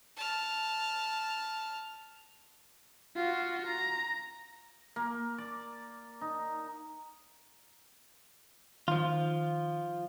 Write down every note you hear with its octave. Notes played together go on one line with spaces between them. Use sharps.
A5 F6
F4 F#4
A#5
A#3
D5
D#4
D#3 F3 F4